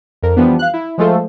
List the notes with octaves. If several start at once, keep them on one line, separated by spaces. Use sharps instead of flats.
F2 A#4
E3 F3 G3 B3 D4
F5 F#6
E4
F3 G#3 A3 F4 A4 C5